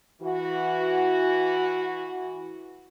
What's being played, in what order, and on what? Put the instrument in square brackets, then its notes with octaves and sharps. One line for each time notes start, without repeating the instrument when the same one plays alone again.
[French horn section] E3 F#4